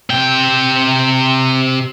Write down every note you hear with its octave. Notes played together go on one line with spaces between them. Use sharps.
C3 G5